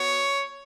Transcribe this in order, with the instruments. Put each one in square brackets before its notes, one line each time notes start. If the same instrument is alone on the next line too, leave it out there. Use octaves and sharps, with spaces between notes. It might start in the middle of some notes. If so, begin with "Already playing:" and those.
Already playing: [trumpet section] B3 F#4 C#5